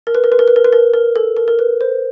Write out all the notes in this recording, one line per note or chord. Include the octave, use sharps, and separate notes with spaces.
A#4
B4
A#4
B4
A#4
B4
A#4
B4
A#4
A#4
A4
A#4
A#4
B4
C5